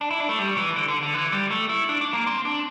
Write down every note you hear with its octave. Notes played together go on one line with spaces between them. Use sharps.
D4
E4
D4
A3
G3
E3
D3
D3
D3
E3
G3
A3
E4
D4
D4
A#3
C4
D4